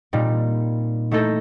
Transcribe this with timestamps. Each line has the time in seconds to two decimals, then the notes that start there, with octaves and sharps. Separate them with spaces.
0.13 A#2 G3 C4 D#4
1.11 A3 D#4 E4 A4 G6 A#6